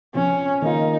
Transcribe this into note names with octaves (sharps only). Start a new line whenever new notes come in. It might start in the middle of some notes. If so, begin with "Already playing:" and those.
C3 F3 C4 C#4 F4
D#3 A#3 D#4 F4